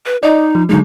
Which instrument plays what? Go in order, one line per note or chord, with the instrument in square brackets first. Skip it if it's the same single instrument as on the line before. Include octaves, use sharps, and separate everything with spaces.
[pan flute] B4
[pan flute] D#4 [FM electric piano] D5 D#5
[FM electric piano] F3
[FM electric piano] D3 F#3 G#3 [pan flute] D#4